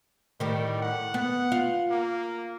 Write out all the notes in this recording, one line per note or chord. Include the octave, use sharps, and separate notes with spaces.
A2 D#3 G3
F#5
B3
F4
A#3